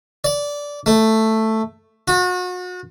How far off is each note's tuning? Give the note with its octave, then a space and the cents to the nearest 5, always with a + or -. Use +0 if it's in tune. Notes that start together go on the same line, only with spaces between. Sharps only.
D5 -15
A3 +5
F#4 -35